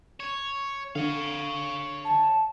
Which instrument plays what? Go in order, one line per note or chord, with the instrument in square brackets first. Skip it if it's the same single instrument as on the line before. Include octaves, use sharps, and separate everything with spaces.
[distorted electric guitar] C#5
[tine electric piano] D3 [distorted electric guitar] C#5 F5
[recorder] A5